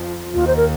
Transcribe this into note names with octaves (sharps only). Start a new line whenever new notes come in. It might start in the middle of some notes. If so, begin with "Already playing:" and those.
Already playing: F2 F3
D#2 D#3 F4
C5
A#4